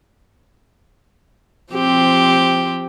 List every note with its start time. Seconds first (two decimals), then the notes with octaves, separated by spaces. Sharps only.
1.72 F3 C4 G4